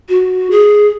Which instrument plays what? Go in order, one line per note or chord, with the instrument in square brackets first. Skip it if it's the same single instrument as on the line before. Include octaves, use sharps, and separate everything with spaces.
[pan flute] F#4
G#4